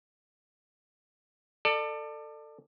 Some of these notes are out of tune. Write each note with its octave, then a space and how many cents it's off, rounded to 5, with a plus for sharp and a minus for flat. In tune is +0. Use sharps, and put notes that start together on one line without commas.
A4 +20 D5 +30